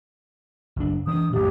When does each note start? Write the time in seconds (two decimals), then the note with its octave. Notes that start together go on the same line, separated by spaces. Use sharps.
0.76 F#1 D4
1.07 E3 C#4 D4 D#6
1.33 F2 A2 G4